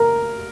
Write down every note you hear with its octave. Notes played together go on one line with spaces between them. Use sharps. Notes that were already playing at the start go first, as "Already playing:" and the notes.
Already playing: A#4